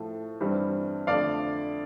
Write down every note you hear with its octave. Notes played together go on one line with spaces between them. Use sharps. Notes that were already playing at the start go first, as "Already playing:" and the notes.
Already playing: A2 F3 A3
G2 E3 G3 C4
F2 D3 A3 D5 F5